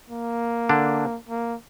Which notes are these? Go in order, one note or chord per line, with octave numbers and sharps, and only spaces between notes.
A#3
D3 D4
A#3